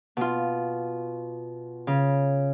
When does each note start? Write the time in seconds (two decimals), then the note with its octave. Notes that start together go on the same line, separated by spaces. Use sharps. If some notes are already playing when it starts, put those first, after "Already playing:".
0.17 B2 F4
1.87 C#3